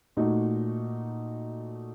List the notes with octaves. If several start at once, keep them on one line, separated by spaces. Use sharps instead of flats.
A#2 A3 D#4 F#4